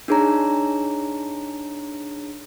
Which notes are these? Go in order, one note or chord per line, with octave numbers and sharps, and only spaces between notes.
D4 D#4 G#4 C#5 A#5